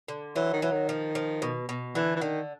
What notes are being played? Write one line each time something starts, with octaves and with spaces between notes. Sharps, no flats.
D3
E3 F#3
D#3
E3 F#3
D#3
F3
F3
B2
B2
D3 E3
E3
D3 D#3